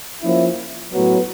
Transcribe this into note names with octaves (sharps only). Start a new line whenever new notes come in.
F3 A#3 C#4 E4
A2 F#3 B3